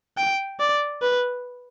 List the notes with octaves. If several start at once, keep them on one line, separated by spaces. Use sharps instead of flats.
G5
D5
B4